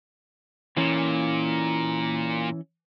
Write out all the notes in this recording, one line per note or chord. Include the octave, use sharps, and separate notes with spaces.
A#2 E3 C#4